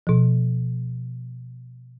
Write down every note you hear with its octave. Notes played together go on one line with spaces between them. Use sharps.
B2 F3